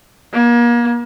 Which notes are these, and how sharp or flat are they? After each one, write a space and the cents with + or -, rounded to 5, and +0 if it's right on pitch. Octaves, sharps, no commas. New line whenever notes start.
A#3 +35